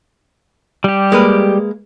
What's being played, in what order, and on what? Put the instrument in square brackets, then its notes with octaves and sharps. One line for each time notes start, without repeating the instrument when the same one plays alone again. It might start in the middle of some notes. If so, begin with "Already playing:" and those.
[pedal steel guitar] G3 G4
[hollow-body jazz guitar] G#3 A#3 B4